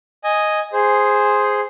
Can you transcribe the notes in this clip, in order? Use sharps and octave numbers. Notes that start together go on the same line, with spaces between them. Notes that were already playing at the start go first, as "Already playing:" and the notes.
D#5 G#5
G#4 C5